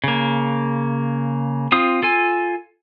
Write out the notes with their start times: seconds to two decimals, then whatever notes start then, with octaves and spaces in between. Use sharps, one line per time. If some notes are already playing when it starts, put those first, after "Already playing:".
0.04 C#3 A#3
1.72 C4 F4 D#6
2.03 F4 A4 G#5